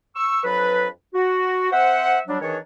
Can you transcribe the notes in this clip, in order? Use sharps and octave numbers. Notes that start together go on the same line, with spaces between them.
C#6 E6
F2 F#3 D4 B4
F#4
C4 C5 E5 F#5
F#3 G3 D4
D#3 E3 D4 G#4 C#5